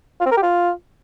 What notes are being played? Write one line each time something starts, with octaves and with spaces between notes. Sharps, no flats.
F4
C4
A#4
G4
F4